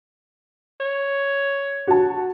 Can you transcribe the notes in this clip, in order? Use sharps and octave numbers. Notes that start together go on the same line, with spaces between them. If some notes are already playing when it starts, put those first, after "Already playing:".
C#5
F#4 A5